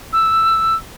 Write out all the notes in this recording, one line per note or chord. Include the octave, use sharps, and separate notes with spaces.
E6